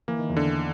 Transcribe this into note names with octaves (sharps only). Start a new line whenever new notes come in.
E3 A#3
D#3
E2 E3
D3